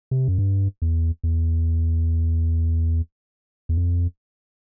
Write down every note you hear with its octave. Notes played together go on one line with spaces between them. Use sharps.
C3
F#2
G2
E2
E2
E2
F2